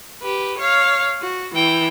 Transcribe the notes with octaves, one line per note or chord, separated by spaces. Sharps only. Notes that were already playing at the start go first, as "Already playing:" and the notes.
G4 B4
C#5 F5
F#4
E3 G5